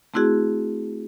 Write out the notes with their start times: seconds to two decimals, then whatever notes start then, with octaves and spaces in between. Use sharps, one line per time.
0.14 A3 C4 E4 F#4 G#4